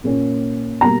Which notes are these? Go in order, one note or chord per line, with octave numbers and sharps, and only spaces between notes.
A#2 A#3 C#4
B2 G3 A#3 A#5